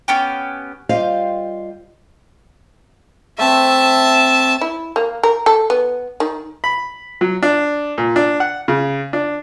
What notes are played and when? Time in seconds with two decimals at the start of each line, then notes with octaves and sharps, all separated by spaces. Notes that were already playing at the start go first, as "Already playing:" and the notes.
0.08 B3 C#4 G4
0.89 G3 F4 G4 C5 D#5 F5
3.38 A3 C4 E5 A5
4.61 E4
4.96 A#3
5.23 A#4
5.46 A4
5.70 B3
6.20 D#3
6.64 B5
7.21 F#3
7.43 D4
7.98 A#2
8.16 D4
8.40 F#5
8.68 C#3
9.13 D4